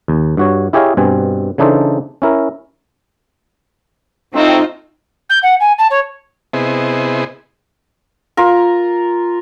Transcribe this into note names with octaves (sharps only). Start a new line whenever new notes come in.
D#2
G2 F#4 C#5
E4 G4 G#4 C#5 D#5 F5
G2 B2 C4 G#5
C#3 E3 D4 D#4 A4 C5
C#4 E4 A#4
A2 A3 C4 D#4 F4
G6
F#5
G#5
A5
C#5
C3 B3 E4 G#4 C5 D#5
F4 A#4